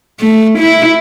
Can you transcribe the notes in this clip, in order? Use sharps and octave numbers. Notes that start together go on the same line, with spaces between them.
A3
E4